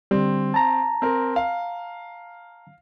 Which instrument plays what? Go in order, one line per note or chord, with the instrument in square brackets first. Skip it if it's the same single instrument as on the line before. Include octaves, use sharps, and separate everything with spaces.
[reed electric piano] D3 G3 [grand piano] C4
[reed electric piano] A5 A#5
[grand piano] C4 A#4
F5